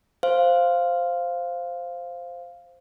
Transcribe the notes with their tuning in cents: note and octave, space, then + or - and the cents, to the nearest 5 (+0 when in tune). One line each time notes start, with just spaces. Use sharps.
C5 +0 F5 +0